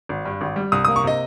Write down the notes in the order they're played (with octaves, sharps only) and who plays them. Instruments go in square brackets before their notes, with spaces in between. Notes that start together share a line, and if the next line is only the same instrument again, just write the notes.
[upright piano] G#1
G2
G#1
G3
C2 D#6
D#6
A#3
C#6
C3 D#5